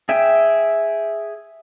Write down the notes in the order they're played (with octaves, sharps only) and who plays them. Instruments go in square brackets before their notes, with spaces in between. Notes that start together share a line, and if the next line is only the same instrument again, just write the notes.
[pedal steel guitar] G#4 E5 G5